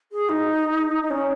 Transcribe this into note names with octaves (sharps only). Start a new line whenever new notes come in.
G#4
D#4
D#4
C#4